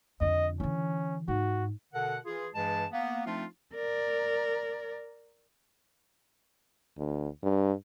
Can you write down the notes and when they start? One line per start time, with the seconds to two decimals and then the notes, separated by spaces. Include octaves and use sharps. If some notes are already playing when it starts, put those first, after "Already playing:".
0.21 F2 D3 D#5
0.60 D3 E3 C#4
1.28 G#2 F#4
1.93 B2 D3 A4 A#4 F#5
2.25 E3 F4 G#4
2.55 G2 E3 G#3 G#4 A5
2.92 A#3 B3
3.26 F3 A3 C4 D4 D#4 F4
3.74 A#4 D5
6.98 D2
7.43 G2